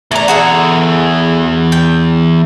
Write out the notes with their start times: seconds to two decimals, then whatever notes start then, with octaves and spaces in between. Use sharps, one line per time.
0.11 E2 A3 D4 A#5
0.28 F#4 G#4 A4
1.72 G5